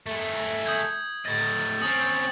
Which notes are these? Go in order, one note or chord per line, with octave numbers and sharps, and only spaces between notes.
A3 G#4
D#6 G6 G#6
A2 D#5 A6
C4 C#4 D#6 A6 F#7